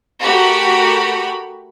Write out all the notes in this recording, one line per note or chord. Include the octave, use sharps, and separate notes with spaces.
A3 F#4 G4 A#4 B5